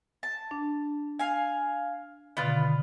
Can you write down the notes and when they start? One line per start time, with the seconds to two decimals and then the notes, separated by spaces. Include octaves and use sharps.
0.23 A5
0.51 D4
1.19 F5 G#5
2.37 B2 D3 D#3 B3 F4